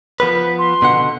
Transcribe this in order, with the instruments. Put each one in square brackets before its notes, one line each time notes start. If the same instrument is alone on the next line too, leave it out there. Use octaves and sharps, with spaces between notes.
[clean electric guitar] F3 B3 B4 [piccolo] B6
[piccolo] C6
[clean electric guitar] B2 D3 F#5